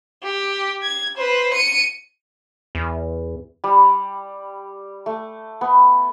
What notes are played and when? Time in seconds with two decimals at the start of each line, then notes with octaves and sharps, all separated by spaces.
0.23 G4
0.83 G#6
1.17 B4 C5
1.54 C#7 D#7
2.75 E2
3.64 G3
5.06 A3
5.61 B3